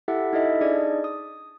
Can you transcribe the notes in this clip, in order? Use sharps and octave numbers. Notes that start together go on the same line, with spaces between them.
E4 G4 A4 E5 F#5
D#4 E4 A4 D#5 E5
D4 D#4 G#4 D5 D#5
D#6